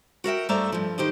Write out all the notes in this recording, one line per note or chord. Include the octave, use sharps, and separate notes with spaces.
F#4 A#4 E5 G5
G2 A3 C5 D5 E5 A#5
G2 F3
D#3 G4 C5 D#5